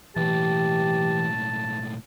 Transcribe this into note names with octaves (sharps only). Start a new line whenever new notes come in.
B1 A2 E3 G4 A5